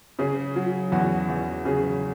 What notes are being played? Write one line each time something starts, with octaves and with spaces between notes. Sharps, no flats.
C#3 G#4
F#3
E2 F#4
E2
C#3 G#4